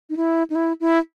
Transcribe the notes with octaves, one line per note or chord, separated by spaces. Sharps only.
D#4
E4
D#4
E4
E4